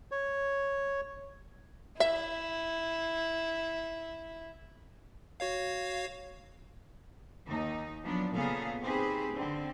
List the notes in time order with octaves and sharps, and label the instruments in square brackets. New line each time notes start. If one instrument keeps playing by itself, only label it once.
[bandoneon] C#5
[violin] E4 [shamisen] E5
[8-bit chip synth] F#4 C#5 F5
[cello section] D#2 D#4
F3 F#3 B3 D4
A#2 C#3 B3 G#4 A4 F5
C4 D#4 G4 G#4 B4 C5
D3 C4